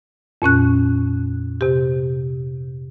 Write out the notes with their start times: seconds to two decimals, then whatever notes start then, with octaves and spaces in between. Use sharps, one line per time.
0.42 F2 A#2 C#4 F#6
1.61 C3 G4